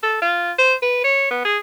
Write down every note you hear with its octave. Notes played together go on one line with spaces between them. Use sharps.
A4
F4
C5
B4
C#5
B3
G#4